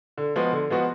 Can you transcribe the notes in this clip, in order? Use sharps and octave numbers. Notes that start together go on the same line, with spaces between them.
D3
F3 G#3 B3 F#4
D3
F3 G#3 B3 F#4